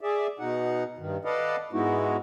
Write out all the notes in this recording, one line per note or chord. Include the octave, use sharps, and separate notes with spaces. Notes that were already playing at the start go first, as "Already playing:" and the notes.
G#4 D5 E5
B2 D#4 F#5
G2 D#3
A4 B4 D5 D#5 F5 F#5
G#2 G#3 B3 D#4 E4 F#4